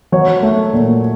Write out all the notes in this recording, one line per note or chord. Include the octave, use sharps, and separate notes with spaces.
F#3 C#5
A3
A#2